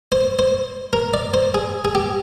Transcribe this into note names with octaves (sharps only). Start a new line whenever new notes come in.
C5
C5
A#4
D5
C5
G#4
G#4
G4